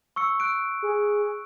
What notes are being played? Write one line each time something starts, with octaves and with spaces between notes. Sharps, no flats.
C#6 E6 C#7
E6 F#6 D7
G#4